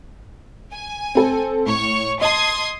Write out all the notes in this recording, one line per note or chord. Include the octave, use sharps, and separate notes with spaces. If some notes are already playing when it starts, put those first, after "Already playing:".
G#5
C4 A4
A2 C#5 C#6
D#5 A5 C6 D#6 G#6